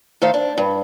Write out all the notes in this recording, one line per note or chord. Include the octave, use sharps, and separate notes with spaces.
D#3 A3 C5 E5 F5
D4
G2